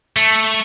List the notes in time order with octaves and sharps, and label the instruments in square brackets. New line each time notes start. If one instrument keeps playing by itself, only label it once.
[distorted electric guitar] A3